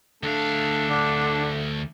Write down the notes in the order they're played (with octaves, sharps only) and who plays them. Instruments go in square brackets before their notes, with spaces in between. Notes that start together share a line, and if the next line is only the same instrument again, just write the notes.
[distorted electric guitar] D2 F5 [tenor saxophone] A3 [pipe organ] D4
[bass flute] D3